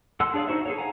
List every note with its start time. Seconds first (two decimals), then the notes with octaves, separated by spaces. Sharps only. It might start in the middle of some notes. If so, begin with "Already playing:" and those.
0.20 A4 F#5 C6 E6 F#6
0.34 D4 G#4 C#5 D5 F5
0.48 D#4 F#4 C5 E5
0.66 G#4 A4 C#5
0.78 F5 F#5 G#5 A#5